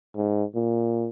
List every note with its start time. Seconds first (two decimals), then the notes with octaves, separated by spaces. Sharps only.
0.16 G#2
0.55 A#2